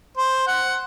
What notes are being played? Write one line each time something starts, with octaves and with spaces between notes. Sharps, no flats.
C5
F#5